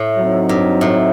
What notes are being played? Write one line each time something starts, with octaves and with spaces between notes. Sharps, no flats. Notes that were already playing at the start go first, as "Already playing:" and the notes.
Already playing: A2
F#3 C4 D#4
G2
A2